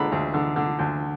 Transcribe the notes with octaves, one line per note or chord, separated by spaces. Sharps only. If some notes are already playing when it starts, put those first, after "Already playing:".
Already playing: D2 D3 G#3 B5
D2
D3
D3
D2